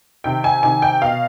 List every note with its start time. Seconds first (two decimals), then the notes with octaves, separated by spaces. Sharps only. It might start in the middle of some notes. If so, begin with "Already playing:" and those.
0.24 C3 D#3 G5
0.44 G#5
0.63 C3 D#3 G#5
0.82 G5
1.02 B2 F5